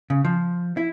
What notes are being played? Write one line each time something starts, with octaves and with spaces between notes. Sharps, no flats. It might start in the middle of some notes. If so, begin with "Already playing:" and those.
C#3
F3
E4